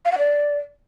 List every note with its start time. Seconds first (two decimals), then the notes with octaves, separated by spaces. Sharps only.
0.05 F5
0.12 F#5
0.18 D5